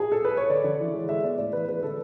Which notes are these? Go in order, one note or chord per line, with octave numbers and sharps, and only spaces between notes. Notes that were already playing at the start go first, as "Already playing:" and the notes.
G#4
A4
B4
C#5
D3 D5
D3
E3
G#3
G#3 E5
B3 D5
A2 D5
E3 B4
G#3 B4
D3 A4